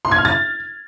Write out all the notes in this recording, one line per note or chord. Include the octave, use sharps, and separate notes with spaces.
C6
G#6
F6
A6